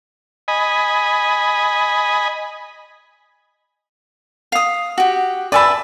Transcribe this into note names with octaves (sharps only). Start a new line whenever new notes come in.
D#5 G#5 B5
F5 D#6
F#4 G4
B4 D5 E5 G#5 A5 B5